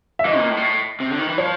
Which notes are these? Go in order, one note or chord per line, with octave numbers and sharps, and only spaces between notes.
E5
E3 D#5
A#2
A2
A#2
A2
C3
D3
D#3
E3
F3 C#5